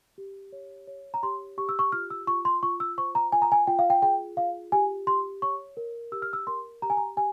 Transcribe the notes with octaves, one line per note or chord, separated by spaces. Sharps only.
G4
C#5
C#5
A#5
G4 C6
G4 C#6
E6
C#6
F4 F6
E6
F4 C#6
C6
F4 C#6
E6
C5 C#6
A#5
F4 G#5
A#5
G#5
F4 G5
F5
G5
G#4 G5
F4 F5
G4 G#5
G4 C6
C#5 C#6
A#4
G4 E6
F6
E6
A#4 C6
G4 A#5
G#5
A#5
G4 G#5